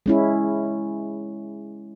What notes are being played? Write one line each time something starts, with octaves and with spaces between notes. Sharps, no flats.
G#3 C#4 E4